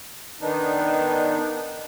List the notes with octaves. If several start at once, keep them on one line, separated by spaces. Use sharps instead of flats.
D#3 B3 D4 D#4